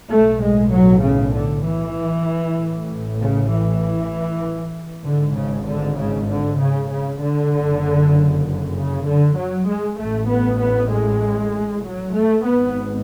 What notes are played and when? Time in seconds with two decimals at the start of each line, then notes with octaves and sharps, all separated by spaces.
0.10 B1 A2 A3
0.42 G#3
0.72 F#3
1.03 C#3
1.34 D3
1.65 E3
2.57 A1 A2
3.19 C#3
3.50 E3
5.04 G#1 G#2 D3
5.35 C#3
5.66 D3
5.97 C#3
6.29 D3
6.60 C#3
6.89 C#3
7.21 D3
7.51 F#1 F#2 C#3
8.74 C#3
9.07 D3
9.37 F#3
9.68 G#3
9.99 A1 A2 A3
10.30 B3
10.60 B3
10.91 G#3
11.84 F#3
12.15 A3
12.45 G#1 G#2 B3